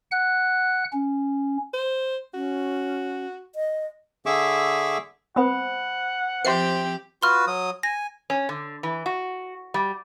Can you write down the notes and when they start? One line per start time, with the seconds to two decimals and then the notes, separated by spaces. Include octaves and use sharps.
0.11 F#5 F#6
0.93 C#4
1.74 C5
2.34 C#4 F#4
3.55 D#5
4.26 D3 G#4 E5 C#6 D6 E6
5.36 B3 C4 C5 F#5 B5 D#6
6.45 F3 C4 G4 C5 E5 C6 C7
7.23 F4 F#4 B4 C6 F6
7.47 F#3 D#6
7.83 G#5 A#6
8.30 C#4
8.49 D3
8.83 E3
9.06 F#4
9.74 G3